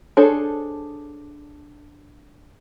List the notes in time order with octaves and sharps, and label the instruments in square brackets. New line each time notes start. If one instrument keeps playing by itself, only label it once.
[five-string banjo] D4 G#4 A4 C5 C#5